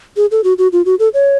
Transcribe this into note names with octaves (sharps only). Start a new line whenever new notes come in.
G#4
A4
F#4
F#4
F4
F#4
A4
C#5